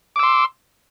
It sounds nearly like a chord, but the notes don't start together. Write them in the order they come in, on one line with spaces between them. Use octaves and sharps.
D6 E6 C6